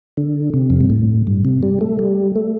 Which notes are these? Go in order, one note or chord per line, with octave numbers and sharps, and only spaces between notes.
D3
C3
F2
G2
A2
G2
C3
G3
A3
G3
A3